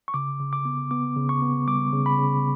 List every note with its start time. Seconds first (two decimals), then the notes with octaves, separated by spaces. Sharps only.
0.08 C#6
0.14 C#3 D6
0.40 C#3
0.53 D6
0.65 B3
0.91 B3 D6
1.16 C#3
1.29 C#6
1.42 B3
1.68 G3 D6
1.93 C#3
2.06 B5
2.19 C#3